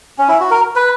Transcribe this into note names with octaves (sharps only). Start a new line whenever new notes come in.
C#4
E4
F#4
A#4
B4